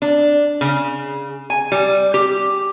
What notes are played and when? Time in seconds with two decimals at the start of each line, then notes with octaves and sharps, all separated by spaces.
0.02 D4
0.61 C#3
1.50 G#5
1.72 G3
2.14 G4